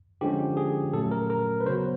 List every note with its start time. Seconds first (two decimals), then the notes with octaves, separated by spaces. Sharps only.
0.21 D3 F3 G#3 C#4 G4
0.57 G#4
0.93 A#2 F#3 A3 C#4 A4
1.11 A#4
1.30 A#4
1.61 B4
1.66 C#3 F#3 B3 C5